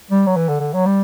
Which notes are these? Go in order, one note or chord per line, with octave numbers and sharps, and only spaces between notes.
G3
F#3
E3
D3
D3
F#3
G3